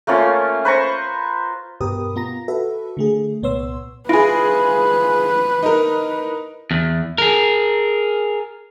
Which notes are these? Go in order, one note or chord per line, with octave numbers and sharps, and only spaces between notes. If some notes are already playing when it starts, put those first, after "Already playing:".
A3 A#3 C#4 F4
B4 C5 A#5 C#6
G2 B2 G4 A#4 B4 D#6
B3 F4 A#5 A#6
F#4 A4 B4 E5
D3 A3 G#4
C2 A#2 B3 C#5 C6 E6
E4 F4 G#4 B4
D#4 A#4
E2
G#4 A#4